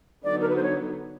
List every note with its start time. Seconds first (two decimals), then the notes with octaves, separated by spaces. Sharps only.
0.23 D3 F#3 B3 D#4 D5
0.41 A#4
0.49 B4
0.56 C5
0.63 C#5